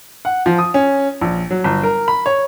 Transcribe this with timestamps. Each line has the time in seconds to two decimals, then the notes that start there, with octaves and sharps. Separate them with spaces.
0.25 F#5
0.46 F3
0.58 D#6
0.74 C#4
1.22 A#1
1.51 F#3
1.64 G1
1.83 A#4
2.08 B5
2.26 C#5